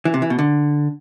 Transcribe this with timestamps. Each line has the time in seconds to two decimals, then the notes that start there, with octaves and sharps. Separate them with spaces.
0.05 E3
0.14 C3
0.22 E3
0.30 B2
0.39 D3